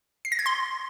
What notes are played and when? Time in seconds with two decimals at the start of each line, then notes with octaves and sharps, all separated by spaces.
0.25 C7
0.32 A#6
0.39 G#6
0.46 C6